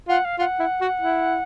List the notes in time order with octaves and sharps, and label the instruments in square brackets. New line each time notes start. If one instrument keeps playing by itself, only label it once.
[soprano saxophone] F4 [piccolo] F#5
[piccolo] F5
[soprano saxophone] F4 [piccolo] F#5
[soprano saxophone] E4
F#4
E4